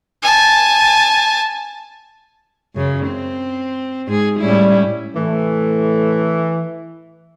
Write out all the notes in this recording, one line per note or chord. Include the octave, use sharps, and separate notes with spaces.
G#5 A5
F#2 C#3
C4
G#2 G#4
A2 G3 C#4 E4
A2 C3 E3 A3